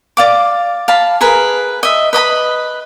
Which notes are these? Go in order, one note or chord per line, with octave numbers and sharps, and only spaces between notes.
D5 F5 D6
F5 A5 B5
G#4 A#4 B4
D#5 E5
B4 D#5 A#5 B5